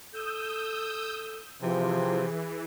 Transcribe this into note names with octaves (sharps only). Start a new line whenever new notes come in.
A4 D#6 E6 G6
C3 E3 F3 G#4